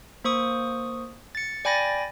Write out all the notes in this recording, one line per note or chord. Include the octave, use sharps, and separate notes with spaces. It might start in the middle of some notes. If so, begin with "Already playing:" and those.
A#3 C5 C#6 D#6
A6 C#7
D5 G5 G#5 B5 A6 A#6